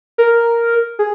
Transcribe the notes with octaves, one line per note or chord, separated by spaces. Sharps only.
A#4
G#4